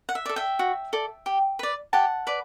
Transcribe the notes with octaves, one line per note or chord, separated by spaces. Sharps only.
F#5
E5
A4 D5
E5 G5
F#4
A4 D5
G4
B4 D5
G4 F#5 A5
B4 D5